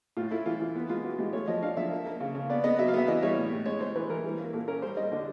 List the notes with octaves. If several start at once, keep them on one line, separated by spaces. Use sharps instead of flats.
A2 F4
A3 E4
E3 F4
E3 F4
B3
G#3 F4
E3 F#4
G#3 G4
A3 C#5
F3 D#5
D4 F5
F3 E5
A#3
A#3
C#3
C#3
B3 D5
B3 D#5
F#3 E5
F5
B3 E5
E3 D#5
G3 C#5
A2
A2
G#3 C#5
G#3 C5
E3 B4
E3 A#4
G3
A#3
A#2 A4
C#4 A#4
G3 C5
G3 D#5
D3